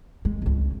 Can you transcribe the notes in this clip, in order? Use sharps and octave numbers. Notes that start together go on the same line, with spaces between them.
G#3
G#1 C#2